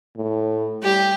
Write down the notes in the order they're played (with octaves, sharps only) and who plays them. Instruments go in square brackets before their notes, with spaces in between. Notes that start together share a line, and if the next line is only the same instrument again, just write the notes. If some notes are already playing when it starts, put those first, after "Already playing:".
[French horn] A2
[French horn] G3 [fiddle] G4